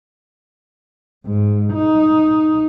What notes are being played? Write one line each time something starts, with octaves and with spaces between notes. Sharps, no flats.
G#2
D#4